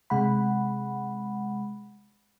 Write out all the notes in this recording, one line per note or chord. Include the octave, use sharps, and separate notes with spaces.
C3 G#3 F#5 B5